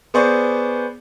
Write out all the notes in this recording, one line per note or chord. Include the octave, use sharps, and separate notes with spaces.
B3 G#4 C5 D5 C#6